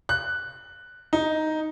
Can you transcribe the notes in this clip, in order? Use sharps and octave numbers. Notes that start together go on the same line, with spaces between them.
F#6
D#4